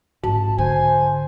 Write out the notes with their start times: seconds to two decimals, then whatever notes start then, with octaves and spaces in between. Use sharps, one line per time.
0.24 A1 G#2 A5
0.58 D3 C5 G#5